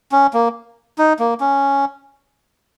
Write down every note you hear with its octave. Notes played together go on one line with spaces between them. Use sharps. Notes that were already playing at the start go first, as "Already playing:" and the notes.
C#4
A#3
D#4
A#3
C#4